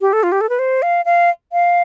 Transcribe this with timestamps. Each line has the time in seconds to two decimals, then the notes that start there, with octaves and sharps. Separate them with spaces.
0.01 G4
0.13 A4
0.23 F4
0.32 G4
0.41 A4
0.49 B4
0.59 C5
0.82 F5
1.05 F5
1.53 F5